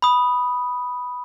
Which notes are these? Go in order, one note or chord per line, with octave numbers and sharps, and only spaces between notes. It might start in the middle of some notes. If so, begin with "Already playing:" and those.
B5 D#6